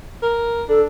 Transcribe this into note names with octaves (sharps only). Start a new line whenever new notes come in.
A#4
D4 A4